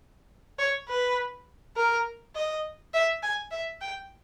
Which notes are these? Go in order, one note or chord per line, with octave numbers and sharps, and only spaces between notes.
C#5
B4
A#4
D#5
E5
G#5
E5
G5